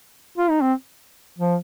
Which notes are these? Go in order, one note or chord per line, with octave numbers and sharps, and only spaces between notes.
F4
D#4
C4
F3